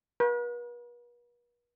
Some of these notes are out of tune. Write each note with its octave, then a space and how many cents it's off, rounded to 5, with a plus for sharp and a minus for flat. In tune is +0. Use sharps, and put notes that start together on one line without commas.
B4 -45